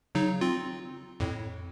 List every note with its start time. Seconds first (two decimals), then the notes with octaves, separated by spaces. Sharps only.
0.15 C#3 F#3 D#4
0.41 C4 F4
1.20 F2 A2